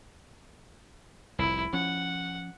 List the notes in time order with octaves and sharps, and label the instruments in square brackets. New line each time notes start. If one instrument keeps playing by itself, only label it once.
[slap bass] F1 C2 [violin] E4
[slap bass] F3 C#4 [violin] F#5